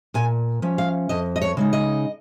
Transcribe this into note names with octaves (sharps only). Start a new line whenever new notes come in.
A#2 G#5
F3 C#4
F5
F2 D#5
D#5
C#5
C#3 G#3 D#4
D#5